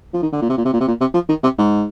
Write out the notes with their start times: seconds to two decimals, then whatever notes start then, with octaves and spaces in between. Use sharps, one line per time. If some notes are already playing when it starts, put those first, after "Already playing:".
0.14 F3
0.23 D#3
0.33 D3
0.42 A#2
0.49 C3
0.58 A#2
0.65 C3
0.73 A#2
0.80 C3
0.88 A#2
1.01 C3
1.14 F3
1.29 D#3
1.43 C3
1.58 G#2